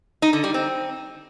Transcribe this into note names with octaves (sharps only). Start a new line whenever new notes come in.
D#4
D3
G3
C4